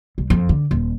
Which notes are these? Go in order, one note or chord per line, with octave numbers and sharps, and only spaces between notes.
C2
F2
D3
D#1